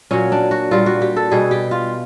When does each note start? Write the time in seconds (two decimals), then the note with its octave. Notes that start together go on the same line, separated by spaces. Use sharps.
0.11 A#2 F#3 C#4
0.32 D4
0.51 F#4
0.71 A#2 G3 F4
0.86 F#4
1.02 G4
1.16 A4
1.31 B2 G3 G#4
1.51 G4
1.71 F4